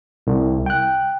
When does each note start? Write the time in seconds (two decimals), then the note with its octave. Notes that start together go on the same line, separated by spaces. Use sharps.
0.27 C2
0.66 G5 F#6